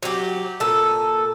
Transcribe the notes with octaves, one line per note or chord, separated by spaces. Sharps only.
F#3 G4
A#2 A4